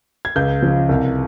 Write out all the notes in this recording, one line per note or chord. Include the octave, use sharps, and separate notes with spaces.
G#6
C#2 G6
C#3 F3
C2